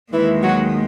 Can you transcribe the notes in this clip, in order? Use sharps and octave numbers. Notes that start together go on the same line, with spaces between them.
D#2 D#3 E3 G#3 E4
F#3 F#4